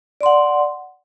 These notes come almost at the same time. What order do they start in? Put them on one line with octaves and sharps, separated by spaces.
D5 C6 F#5